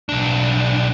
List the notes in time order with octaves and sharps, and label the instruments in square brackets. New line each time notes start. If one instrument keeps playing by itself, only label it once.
[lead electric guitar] B1 D4